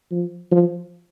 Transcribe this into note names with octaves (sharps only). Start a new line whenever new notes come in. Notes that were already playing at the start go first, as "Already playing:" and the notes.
F3
F3